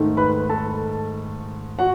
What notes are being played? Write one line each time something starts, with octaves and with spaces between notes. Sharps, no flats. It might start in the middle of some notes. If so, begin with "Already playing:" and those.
Already playing: G#2 D#3 A3
B4 B5
A4 A5
F#4 F#5